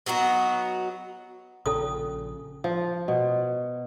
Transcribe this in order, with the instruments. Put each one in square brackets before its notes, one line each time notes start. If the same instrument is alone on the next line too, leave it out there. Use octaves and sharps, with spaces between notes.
[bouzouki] F#3 B3 D#4 F#4
[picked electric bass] A#1 C#3 [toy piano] C#4 A4 D#6
[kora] F3
B2